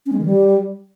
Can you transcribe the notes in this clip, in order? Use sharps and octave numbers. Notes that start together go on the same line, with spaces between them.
C#4
G#3
D#3
G3